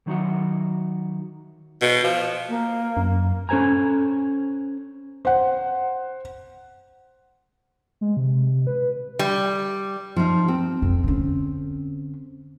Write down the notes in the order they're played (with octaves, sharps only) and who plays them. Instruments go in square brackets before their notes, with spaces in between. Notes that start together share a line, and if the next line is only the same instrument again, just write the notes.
[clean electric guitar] D#3 F#3 D#4 F#4 E5 F#5
[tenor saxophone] B2
F3
[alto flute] A#3
[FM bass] F#2
[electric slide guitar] C#4 A4 C5 G#5 A#5
[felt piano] C5 F#5
[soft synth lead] G#3
C3
B4
[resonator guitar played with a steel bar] G3
[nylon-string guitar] F3 D#4
C4
[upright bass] F2
D3 C#4